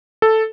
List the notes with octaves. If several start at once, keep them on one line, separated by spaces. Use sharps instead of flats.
A4